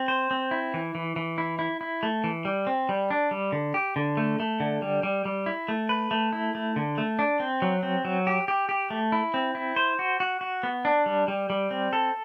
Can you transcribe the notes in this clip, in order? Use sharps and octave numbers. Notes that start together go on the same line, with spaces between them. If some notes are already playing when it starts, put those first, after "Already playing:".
Already playing: C4
C5
C4
E4
E3
E3
E3
E4
E4
E4
A3
E3
G3
C4
G3
D4
G3
D3
G4
D3
A3
A3
D3
G3
G3
G3
E4
A3
B4
A3
E4
A3
D3
A3
D4
C4
F#3
C4
F#3
G4
G4
G4
A3
E4
C4
E4
C5
F#4
F#4
F#4
B3
D4
G3
G3
G3
C4
A4